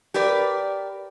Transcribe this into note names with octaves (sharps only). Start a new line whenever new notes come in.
G4 A#4 B4 D5